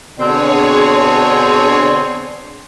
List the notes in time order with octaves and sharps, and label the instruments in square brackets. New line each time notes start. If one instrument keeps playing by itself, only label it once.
[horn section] B2 D3 C4 [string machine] G#4 C#5